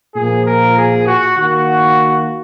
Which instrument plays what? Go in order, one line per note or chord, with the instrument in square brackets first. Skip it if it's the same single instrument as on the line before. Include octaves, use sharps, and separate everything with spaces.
[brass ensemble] A#2 F3 A#3 G#4
A#4
G#4
F#4
D#3 A#3 F#4